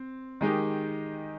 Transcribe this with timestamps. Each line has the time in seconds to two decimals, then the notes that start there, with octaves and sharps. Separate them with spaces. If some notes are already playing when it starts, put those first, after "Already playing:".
Already playing: C4
0.41 D#3 G#3 D#4 G4